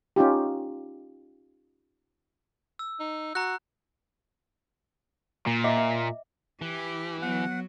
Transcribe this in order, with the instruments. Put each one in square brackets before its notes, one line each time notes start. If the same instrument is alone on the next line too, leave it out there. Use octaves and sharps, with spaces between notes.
[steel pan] C#4 D#4 F4 G4
[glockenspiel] E6
[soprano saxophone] D#4
[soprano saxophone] F#4 [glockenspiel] A#5 F#6
[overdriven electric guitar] A#2
[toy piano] D#5 E5 D6
E5
[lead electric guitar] E3 [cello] G4
[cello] F#3 [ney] B3 [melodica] F#5